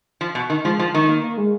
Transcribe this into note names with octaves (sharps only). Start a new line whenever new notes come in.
F3
B2
D#3
F3 G#3
F3
D#3
A#3
A#3
G#3